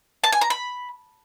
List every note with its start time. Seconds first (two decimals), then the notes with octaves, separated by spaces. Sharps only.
0.24 A5
0.32 G#5
0.41 A#5
0.50 B5